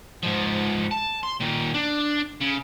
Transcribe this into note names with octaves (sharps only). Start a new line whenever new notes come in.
G#2 F3
A5
C6
A#2 D#3
D4
C#3